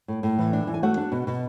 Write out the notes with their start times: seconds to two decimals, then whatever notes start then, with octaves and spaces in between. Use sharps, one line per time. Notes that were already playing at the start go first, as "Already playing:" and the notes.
0.08 A2
0.23 A2
0.38 E3
0.53 D4
0.67 E3
0.74 G#5
0.83 A3 F#4 F#5
0.97 D4
1.12 B2
1.27 B2